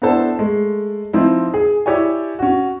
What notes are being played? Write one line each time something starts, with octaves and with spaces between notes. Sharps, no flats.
B3 D4 E4 A4 C5 A5
G#3 A3
F3 C4 D#4 E4
G#4
E4 G4 C#5 D5 G#5
C#4 F#4